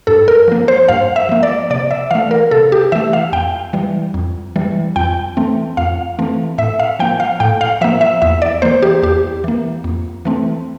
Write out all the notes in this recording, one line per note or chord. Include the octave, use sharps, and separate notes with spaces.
G2 A4
A#4
F3 A#3
C5
G2 F5
E5
F3 A#3
D5
C3 D5
E5
E3 A3 F5
A#4
C3 A4
G4
E3 A3 E5
F5
F2 G5
E3 G3
F2
E3 G3
F2 G5
E3 A3 C4
F2 F5
E3 A3 C4
A2 E5
F5
F3 A#3 G5
F5
A2 G5
F5
F3 A#3 E5
E5
E2 E5
D5
E3 A#3 C5
G4
E2 G4
E3 A#3
F2
E3 A3 C4